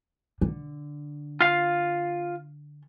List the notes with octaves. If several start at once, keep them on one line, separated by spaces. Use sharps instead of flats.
D3
F4 F5